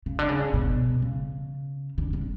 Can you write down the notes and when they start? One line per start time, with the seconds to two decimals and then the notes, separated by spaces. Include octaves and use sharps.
0.06 C#3
0.19 D3
0.29 C#3
0.54 B2
1.02 C#3
1.98 D3
2.13 D3